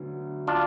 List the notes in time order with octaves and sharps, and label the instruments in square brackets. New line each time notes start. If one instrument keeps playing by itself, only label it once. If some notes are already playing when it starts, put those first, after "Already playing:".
Already playing: [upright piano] D2 D3 F#3 B3
[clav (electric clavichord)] D4 F4